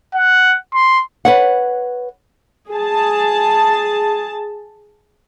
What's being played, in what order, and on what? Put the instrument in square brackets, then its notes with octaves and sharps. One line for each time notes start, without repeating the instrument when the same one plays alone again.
[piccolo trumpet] F#5
C6
[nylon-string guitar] B4 C#5 F#5
[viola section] G#4 A5